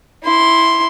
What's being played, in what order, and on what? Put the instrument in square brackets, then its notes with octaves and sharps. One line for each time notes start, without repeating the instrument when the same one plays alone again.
[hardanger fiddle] E4 C6